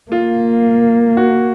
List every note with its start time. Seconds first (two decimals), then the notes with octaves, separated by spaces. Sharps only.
0.12 A#3 F4
1.17 F#4